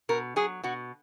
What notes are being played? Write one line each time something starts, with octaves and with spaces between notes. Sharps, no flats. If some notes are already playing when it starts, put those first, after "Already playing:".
B2 A#4
F#3 G#4
B2 F#4